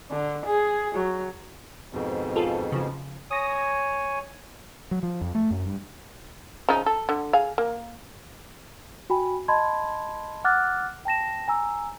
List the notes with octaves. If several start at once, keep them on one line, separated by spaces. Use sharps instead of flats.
D3
G#4
F#3
F2 G#2 B2
F4 G#4 A4
C#3 F3
C#5 G#5 D#6 A#6
F#3
F3
F2
A3
F#2
G2
C#3 F3 D#4
A4
D3
G#4 F5
A#3
F#4 G5 G#5 B5
D#5 A5 B5 C6 G#6
F#5 D6 F6 F#6 A6
G5 A5 A#6 E7
G#5 A#5 E6